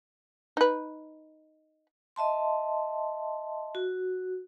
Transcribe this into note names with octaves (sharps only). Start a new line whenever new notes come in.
D#4 B4
D#5 E5 A5 C6
F#4